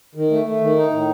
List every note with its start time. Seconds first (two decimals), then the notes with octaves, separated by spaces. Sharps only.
0.15 D#3
0.31 A3
0.46 A3
0.61 D#3
0.76 D#4
0.91 A2